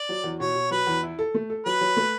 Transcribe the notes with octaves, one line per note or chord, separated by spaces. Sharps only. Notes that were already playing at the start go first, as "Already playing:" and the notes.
Already playing: D5
F#3
E2
B2 C#5
B2
F#3 B4
E2
E4
A4
A3
A4
F#3 B4
F#3
A3